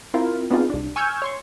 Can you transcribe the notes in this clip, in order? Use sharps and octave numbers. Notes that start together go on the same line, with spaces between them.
C4 E4 F4 A#4
B3 C4 D4 D#4 F4 G#4
C2 D4
G#5 C#6 E6 F6 G6 G#6
C#5 C6 C#6